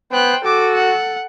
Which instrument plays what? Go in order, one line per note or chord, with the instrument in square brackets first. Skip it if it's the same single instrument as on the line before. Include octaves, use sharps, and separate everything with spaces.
[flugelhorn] B3 [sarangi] C5 [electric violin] G5 F#6
[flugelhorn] F#4 [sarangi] A4 [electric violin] D6
[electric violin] F#5